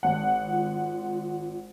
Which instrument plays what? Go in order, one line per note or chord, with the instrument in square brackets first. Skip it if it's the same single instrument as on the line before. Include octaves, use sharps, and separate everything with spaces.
[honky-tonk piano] G#1 F#5
[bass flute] F4